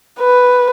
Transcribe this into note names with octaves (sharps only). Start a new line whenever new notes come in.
B4